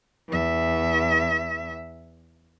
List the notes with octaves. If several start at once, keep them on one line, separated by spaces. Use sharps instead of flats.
E2 E5